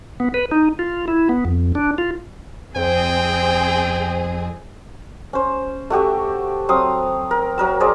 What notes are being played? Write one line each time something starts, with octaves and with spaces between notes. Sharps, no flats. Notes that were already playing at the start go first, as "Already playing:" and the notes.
B3
B4
D#4
F4
E4
B3
F2
D4
F4
F2 C4 G#4 C5 G5
C#4 C5
A3 F#4 G4 E5
F#3 C4 F5 D#6
A#4
F#3 A#4 E6
G#4 C5 D5